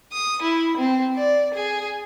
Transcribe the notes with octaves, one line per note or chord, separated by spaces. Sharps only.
D#6
E4
C4
D5
G#4